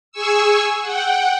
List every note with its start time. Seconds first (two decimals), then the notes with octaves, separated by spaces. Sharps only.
0.12 G#4 G#5 C#6 E6
0.81 F#5 G5